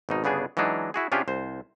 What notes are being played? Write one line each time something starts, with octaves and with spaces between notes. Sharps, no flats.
G#1 B2 D#4
G1 C#3 B3 D4 G#4
E3 F#3 G#3 D4 D#4
E4 F#4 G#4
C3 C#4 D4 F4 G4 G#4
C2 C5